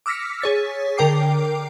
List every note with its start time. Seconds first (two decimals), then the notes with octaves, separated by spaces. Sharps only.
0.06 D6 E6 F6 A#6 B6 C#7
0.40 G#4 C#5 A6 B6
0.97 D3 A#4 G5 D6 C7